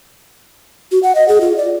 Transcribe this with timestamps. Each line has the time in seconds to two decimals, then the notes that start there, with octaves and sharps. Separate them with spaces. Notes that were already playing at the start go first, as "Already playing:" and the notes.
0.92 F#4
1.03 F#5
1.15 D#5
1.28 G#4
1.41 F4
1.57 D5